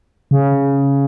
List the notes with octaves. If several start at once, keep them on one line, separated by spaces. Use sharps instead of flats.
C#3